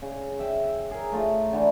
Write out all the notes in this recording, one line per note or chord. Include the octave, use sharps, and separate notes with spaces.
C#3
E5 G5
G#4 A#4
A3 F4 A#5
D3 E3 D#4